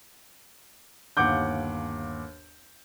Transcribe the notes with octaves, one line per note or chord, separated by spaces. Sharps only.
G1 D#2 F#5 D6 G6